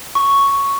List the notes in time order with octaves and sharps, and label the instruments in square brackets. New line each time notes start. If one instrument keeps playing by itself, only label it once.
[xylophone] C#6